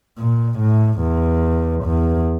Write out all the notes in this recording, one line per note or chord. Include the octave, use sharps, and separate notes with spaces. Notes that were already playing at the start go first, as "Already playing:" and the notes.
A#2
A2
E2
E2